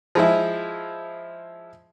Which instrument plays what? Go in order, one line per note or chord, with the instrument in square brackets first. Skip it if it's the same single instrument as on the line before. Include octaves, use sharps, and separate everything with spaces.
[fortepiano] F3 G#3 E4